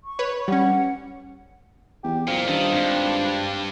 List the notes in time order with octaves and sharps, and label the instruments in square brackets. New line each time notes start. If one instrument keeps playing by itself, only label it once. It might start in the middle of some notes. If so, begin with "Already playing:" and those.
[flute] C#6
[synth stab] B4 C#5
[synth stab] G3 C#4 [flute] F#5
[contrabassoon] E2 [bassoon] G4
[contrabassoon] F#1 [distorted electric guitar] A#2 [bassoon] F3
[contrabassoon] G2 [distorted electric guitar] D#3 [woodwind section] A4 A5
[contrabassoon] G#1 [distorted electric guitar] G2 [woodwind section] D4